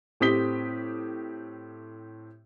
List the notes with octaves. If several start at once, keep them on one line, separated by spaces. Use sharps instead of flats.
A2 C4 G4 D#6 B6 G7